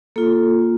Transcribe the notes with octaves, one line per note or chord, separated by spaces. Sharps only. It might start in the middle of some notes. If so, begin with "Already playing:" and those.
A#3 F4 A4